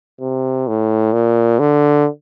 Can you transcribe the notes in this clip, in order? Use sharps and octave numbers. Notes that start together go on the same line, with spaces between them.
C3
A2
A#2
D3